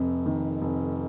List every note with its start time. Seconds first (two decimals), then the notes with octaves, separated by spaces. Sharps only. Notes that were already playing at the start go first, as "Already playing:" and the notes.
Already playing: F1 F2
0.26 D#3
0.62 F1